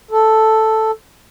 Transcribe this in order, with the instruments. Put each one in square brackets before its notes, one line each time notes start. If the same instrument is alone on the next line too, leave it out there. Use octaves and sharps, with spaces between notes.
[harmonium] A4